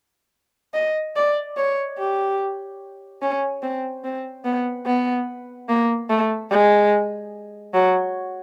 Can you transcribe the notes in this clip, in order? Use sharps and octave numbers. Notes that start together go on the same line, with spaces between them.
D#5
D5
C#5
G4
C#4
C4
C4
B3
B3
A#3
A3
G#3
F#3